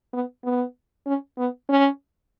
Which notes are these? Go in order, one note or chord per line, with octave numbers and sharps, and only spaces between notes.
B3
B3
C#4
B3
C#4